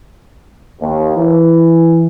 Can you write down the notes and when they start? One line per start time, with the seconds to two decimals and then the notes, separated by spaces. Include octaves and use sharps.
0.81 D#2
1.16 E3